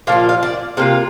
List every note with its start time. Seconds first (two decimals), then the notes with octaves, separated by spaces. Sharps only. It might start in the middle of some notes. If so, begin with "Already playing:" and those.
0.07 A#2 F3 F4 F5
0.29 F5
0.43 D5
0.77 C3 A#3 F4 F5